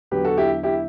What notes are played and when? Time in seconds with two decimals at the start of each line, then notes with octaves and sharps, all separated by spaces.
0.11 E2 D3 F#3 G4 B4
0.24 F#4 A4
0.37 E4 G4
0.63 E4 G4